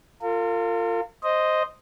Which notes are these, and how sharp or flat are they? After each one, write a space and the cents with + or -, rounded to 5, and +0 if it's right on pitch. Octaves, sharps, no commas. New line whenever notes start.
F4 +0 A#4 -45
C5 +0 D#5 +0